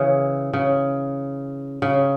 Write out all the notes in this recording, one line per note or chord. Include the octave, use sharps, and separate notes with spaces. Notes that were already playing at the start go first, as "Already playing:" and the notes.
Already playing: C#3 E3
C#3
C#3